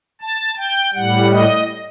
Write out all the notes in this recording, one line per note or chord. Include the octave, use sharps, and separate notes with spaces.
A5
G5
A2 G3 F#5
D#5